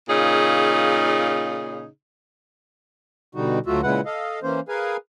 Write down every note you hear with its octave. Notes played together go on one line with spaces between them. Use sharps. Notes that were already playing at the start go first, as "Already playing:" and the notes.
A#2 C#3 D#4 G#4
B2 D3 G3 D#4 F#4
D2 F#3 A3 F4 F#4 E5
A#2 C#3 G#3 E4 B4 F#5
A4 D#5 F5
E3 A#3 C#4 C5
G#4 A#4 B4 F5 G#5